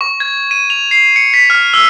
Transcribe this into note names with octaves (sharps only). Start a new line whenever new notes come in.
C#6
G#6
D#7
F7
C7
C#7
B6
F6
E6